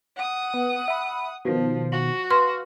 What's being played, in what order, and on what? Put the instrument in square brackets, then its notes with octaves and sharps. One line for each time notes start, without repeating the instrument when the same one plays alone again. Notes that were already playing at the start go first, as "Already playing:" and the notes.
[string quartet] F#5 D#6
[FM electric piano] B3
E5 B5
[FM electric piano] B2 D#3 [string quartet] F3
[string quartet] F#4
[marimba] B4 C6 [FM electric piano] F5